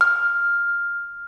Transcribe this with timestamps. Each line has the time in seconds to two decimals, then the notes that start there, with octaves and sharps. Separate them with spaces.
0.01 F6